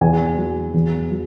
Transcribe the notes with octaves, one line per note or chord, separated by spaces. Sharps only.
E2 G#5
F#3
E2
F#3